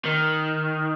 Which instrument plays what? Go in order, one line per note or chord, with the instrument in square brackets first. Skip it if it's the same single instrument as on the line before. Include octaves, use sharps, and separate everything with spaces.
[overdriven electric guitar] D#3